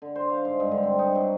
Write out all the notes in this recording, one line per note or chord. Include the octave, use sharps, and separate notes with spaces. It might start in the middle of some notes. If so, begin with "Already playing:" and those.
D3
C5
F5
G#2
G2
D3
C4
D#4
F#3